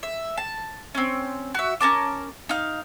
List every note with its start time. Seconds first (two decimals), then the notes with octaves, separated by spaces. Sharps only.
0.03 E5
0.37 A5
0.95 C4 C#4
1.55 F#4 E5
1.81 C#4 A#4 A5 D6
2.49 D#4 F5